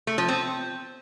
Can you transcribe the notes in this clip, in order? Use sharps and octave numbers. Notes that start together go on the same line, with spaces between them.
A3
F3
C4